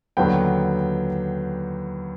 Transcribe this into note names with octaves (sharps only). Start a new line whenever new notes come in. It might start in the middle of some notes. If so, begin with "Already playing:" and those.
D#2 D3 F#3 B3 G5